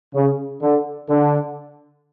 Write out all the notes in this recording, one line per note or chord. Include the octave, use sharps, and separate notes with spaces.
C#3
D3
D3